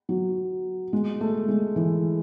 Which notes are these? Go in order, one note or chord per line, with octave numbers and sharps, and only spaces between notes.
F#3
G#3
A3
G#3
E3